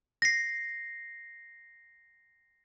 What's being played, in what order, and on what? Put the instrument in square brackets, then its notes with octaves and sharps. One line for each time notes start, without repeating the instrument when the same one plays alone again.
[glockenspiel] A#6 C7